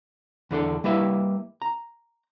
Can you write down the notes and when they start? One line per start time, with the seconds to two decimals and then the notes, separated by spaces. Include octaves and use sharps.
0.51 E2 D3 D4 A4
0.84 G3 A#3 E4 B4 E5 F5
1.62 A#5